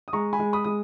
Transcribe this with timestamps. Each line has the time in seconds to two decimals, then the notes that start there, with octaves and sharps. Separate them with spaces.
0.08 D#6
0.13 G#3 A#5 C#6
0.33 G#5 B5
0.39 G#3
0.53 B5 D#6
0.64 G#3 D#6